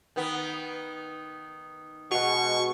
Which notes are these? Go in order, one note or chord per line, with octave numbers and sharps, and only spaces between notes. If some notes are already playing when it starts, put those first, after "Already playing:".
D#3 B3
B2 G#3 F#4 F#5 C#6